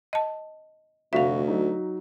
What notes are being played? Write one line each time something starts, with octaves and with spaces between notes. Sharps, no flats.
D#5 A5
F1 D2 F#4 E5 F5 B6
F#3 D#4